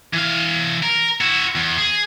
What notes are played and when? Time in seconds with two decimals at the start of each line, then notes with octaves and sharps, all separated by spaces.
0.13 E3 F5
0.83 A#4
1.21 E4 F#4
1.55 E2
1.78 G#4